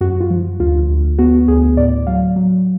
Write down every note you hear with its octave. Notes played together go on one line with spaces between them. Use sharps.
F#2 F#4
F4
F3
D2 F4
D2
B3 F#4
D2 G#4
A2 D5
F#3 F5
F#3